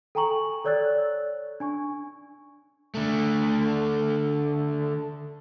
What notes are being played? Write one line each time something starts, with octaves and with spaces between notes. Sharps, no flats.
A4 G5 G#5 A#5 C#6 F#7
A4 C#5 D5 E6 F#6 A6
D4 G#5 C#6
D3 A3